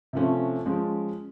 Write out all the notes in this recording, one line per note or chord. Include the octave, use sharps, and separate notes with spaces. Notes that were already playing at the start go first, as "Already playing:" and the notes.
C3 F3 A3 C#4
F3 G#3 C#4